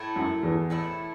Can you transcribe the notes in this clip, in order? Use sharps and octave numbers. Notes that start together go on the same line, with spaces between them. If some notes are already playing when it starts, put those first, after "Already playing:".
Already playing: A2 A3 E4
F#2 F#3
E2 E3
A2 A3 E4